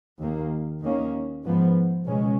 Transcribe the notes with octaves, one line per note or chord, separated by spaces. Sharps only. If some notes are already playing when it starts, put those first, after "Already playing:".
D#2 D#3 A#3
D#2 D#3 A#3 C#4
G#2 F3 B3
C#2 B2 G#3 C#4